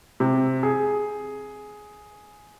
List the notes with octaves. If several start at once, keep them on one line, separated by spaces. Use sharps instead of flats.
C3
G#4